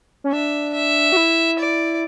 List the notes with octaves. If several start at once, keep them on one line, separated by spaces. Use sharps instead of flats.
C#4
D4 E5
E5
F#4
E4
D5